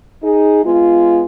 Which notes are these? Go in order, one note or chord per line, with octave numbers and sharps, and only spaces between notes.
D#4 G#4
G#3 B3 F4